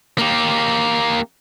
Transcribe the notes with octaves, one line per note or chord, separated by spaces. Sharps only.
A#3 G4